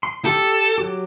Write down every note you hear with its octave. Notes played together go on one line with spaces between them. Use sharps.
C6
G4 A4
F#3 G4